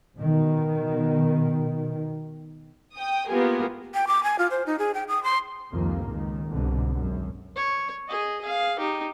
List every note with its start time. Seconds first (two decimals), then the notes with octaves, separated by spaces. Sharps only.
0.18 B2 D#3
2.96 G5 D#6
3.29 A#3 B3 F4 G4 G#4 A#4
3.94 G5
4.07 D6
4.24 G#5
4.39 F4
4.51 C5
4.66 D#4
4.79 G#4
4.94 G5
5.08 D#6
5.24 C6
5.71 C2 F2 D#3 A#3
6.07 C#2 A#2 D#3
6.49 C2 G#2 B2 D3
6.93 G#1 F#2
7.56 C#5
8.08 G#4 D#5
8.41 G#4 F5
8.78 D#4 G4